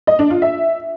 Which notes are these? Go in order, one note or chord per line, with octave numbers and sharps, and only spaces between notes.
D#5
D4
F4
E5